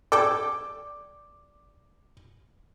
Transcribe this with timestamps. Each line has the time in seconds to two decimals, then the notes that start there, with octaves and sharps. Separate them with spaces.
0.12 A4 D5 G5 D6